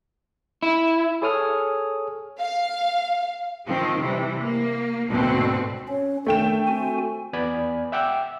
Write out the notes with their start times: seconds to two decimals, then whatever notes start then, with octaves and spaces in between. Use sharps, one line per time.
0.63 E4
1.22 G#4 A4 C#5 G#5 D#6 F6
2.39 F5
3.67 D#3 F3 C4
4.02 C3 E3 G3
4.41 A#3
5.10 D2 G#2 B2 C4
5.89 C#4 C#5
6.27 D#3 A3 D4 G5 E7
6.67 C4 F#4 G#5
7.33 E2 B3 D5 G#5 B5
7.92 E5 F#5 G5 D6 E6